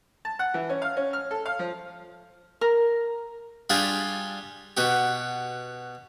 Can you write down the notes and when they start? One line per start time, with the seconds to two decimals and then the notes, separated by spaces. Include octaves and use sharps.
0.25 A5
0.39 F#5
0.54 E3
0.69 C#4
0.82 F5
0.97 C#4
1.13 F6
1.31 A4
1.46 F5
1.59 F3
2.61 A#4
3.70 G3 D4 F4 G4 G#4 F5
4.77 B2 F#4 G4